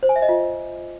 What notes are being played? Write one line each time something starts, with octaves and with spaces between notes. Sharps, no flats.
C5
G#5
E5
D#5
F4